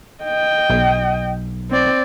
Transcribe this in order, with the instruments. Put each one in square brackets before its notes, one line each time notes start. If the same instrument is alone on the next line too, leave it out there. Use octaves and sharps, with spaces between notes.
[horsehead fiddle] D#5 G5
[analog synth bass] B1
[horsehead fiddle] C4 D5